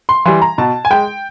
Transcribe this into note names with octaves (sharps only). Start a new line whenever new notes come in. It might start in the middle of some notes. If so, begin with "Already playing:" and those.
C6
E3 G3 C6
A#5
B2 A5
G#5
G#3 G5